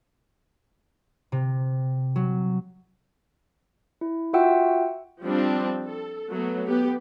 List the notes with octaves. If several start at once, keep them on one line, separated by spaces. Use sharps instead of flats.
C3
F#3
E4
F4 F#4 E5 F#5 G5 E6
F3 G3 C4 D4
A4
F#3 A3 B3
B3 G4